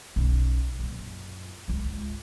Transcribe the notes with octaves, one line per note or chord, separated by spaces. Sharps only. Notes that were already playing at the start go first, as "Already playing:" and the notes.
B1 C#3
F#2 A#2
C#2 G#2